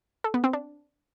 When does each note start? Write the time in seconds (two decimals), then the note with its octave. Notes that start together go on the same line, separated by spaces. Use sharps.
0.24 A4
0.34 B3
0.44 C4
0.53 D4